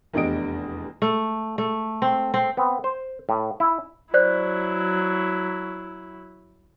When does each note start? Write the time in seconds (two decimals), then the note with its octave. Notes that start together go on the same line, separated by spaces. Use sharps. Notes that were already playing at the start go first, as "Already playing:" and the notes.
0.13 F1 E2 D4 G4 D#5 D7
1.02 A3
1.58 A3
2.02 C4
2.34 C4
2.57 B3 C4
2.84 C5
3.29 A2
3.60 E4
4.14 F#3 E4 C5 D5 F#6